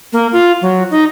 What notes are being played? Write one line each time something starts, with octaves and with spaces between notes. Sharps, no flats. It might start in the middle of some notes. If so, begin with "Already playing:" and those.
A#3
F4
F#3
D#4